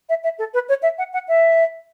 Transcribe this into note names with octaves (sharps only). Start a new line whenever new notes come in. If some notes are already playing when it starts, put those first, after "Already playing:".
E5
E5
A4
B4
C#5
E5
F#5
F#5
E5